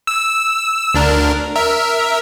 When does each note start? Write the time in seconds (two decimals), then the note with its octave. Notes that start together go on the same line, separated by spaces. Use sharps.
0.07 E6
0.94 D2 D4 A#4
1.56 A#4 E5